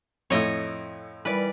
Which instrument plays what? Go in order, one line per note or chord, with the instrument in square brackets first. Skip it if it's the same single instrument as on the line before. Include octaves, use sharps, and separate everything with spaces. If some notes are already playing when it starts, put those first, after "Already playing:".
[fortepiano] F2 A2 [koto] C#5 D#5
[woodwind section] D#3 E3 G3 [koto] B4 D5